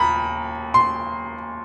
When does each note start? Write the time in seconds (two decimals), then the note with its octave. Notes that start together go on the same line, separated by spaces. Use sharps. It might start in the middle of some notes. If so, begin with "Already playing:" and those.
Already playing: D#2 A#5 B5
0.74 C6